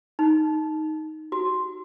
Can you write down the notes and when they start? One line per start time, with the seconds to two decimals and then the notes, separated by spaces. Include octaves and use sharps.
0.19 D#4
1.32 F#4